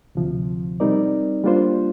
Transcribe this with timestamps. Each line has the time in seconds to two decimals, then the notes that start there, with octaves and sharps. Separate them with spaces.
0.15 D2 C3 F3
0.80 G3 C4 D#4 A#4 D5
1.44 G3 A#3 D4 F4 C5